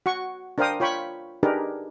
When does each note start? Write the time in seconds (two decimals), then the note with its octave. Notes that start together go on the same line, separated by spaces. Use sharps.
0.06 F#4 F#5 C#6
0.58 D4 A#4 C5 F5 G5 D#6
0.80 F4 C#5 G5 B5 C#6
1.43 D4 D#4 G4 G#4 A#4 B4